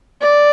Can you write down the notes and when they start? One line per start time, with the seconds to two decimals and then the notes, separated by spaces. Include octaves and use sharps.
0.22 D5